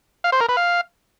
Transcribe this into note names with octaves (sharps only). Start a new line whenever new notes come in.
F5
C5
A#4
B4
F5